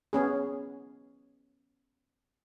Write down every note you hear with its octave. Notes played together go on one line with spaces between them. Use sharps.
B3 C#4 G#4